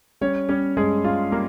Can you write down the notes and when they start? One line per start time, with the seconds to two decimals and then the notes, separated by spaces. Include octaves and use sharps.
0.21 G3 C#4 C#5
0.49 G3 C#4 C#5
0.77 G2 G#3 G#4
1.04 G2 F4
1.32 G3 A#3 A#4